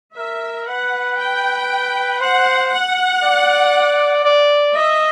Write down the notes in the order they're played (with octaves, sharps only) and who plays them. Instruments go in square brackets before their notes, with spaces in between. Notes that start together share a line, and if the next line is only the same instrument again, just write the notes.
[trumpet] A#4 [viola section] E5
[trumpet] B4 [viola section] F#5
[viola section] G5
[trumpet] C5 [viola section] F#5
[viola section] F#5
[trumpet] D5
D5
[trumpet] D#5 [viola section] E5